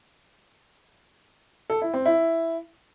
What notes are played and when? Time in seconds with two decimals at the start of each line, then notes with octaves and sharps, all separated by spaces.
1.70 A4
1.82 E4
1.94 C4
2.06 E4